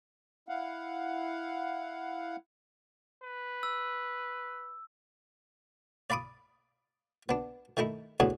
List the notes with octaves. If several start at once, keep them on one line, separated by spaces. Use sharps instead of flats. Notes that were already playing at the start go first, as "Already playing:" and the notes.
E4 F5 F#5
B4
E6
D5 F5 B5 D6 D#6
B3 D4
D#3 A3 D#4 E4
E2 A2 D3 F#4 G#5 D#6